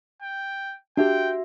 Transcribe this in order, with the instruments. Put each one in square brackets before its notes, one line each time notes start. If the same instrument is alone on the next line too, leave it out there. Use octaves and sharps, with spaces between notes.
[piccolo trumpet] G5
[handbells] D4 G4 [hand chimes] F#4 E5 [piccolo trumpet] G5